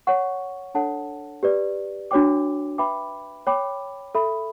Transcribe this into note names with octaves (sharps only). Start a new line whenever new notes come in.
C#5 F#5 C#6
D4 A4 C#5 F#5 A5
G4 B4 D5
D4 F#4 C#5 G5 D6
B4 E5 G5 B5 D6
C#5 G5 B5 D6
A4 E5 B5